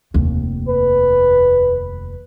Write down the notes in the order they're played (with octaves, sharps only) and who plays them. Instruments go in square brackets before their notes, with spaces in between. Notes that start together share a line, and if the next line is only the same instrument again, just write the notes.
[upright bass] F1 D#2
[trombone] B4